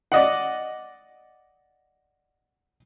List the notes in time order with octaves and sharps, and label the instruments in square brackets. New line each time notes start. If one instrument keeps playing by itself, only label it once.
[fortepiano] D5 D#5 F#5